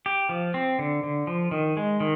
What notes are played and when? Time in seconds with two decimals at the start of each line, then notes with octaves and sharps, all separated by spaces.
0.06 G4
0.29 F3
0.54 C4
0.79 D3
1.03 D3
1.27 F3
1.51 D#3
1.77 G#3
2.00 D#3